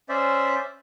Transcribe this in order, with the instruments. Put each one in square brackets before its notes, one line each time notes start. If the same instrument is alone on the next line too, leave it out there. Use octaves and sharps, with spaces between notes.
[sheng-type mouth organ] C#4 C5 D5 E5